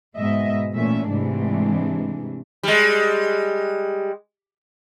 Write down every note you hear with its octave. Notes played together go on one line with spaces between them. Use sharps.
G#2 B2 G#3 D#5 E5
A#2 E3 A3 C#4 E5
G#2 C3 E3 G#3 A3 D4
G3 G#3